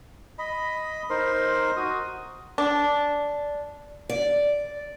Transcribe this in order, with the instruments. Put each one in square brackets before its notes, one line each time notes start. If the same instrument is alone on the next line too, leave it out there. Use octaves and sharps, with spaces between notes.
[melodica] D#5 B5
D#4 A#4 C5 C6
F#4 D#6
[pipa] D4
[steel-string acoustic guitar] D5